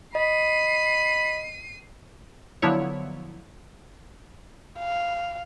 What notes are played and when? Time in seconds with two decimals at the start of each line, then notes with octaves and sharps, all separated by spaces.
0.15 D#5 B5 C7 D#7
2.62 D3 F3 F#3 B3 E4 C#5
4.79 F5